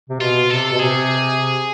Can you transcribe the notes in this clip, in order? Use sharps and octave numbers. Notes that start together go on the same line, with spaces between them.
C3
B2 F4
C3 A4
B2
C3 G#4